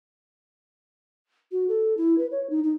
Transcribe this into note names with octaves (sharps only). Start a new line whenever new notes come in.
F#4
A4
E4
B4
C#5
D#4
D#4